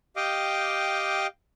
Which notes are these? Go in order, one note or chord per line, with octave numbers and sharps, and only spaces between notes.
G4 D#5 F5 G5 D6